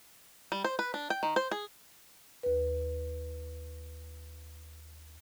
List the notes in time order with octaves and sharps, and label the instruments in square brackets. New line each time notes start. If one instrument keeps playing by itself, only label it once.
[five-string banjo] G3
C5
B4
D4
G5
D#3
C5
G#4
[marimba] D#2 B4